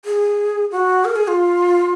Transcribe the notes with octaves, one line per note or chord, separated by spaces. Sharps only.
G#4
F#4
A#4
G#4
F4